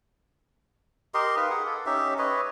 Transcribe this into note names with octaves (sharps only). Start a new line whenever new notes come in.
G4 A#4 D#5 C6
D#4 B4 F5
G#4 F#5
A4
C#4 D#4 G4 E5
B4 C#5 D#5